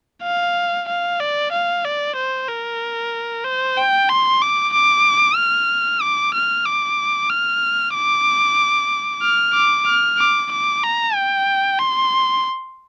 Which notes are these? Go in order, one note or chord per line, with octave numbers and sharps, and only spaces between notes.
F5
F5
D5
F5
D5
C5
A#4
C5
G5
C6
D6
D6
F6
D6
F6
D6
F6
D6
F6
D6
F6
D6
D6
A#5
G5
C6